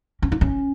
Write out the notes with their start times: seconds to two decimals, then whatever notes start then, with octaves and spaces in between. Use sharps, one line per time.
0.22 C#4
0.32 D#4
0.41 C#4